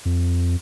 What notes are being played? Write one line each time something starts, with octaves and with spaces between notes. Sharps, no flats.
F2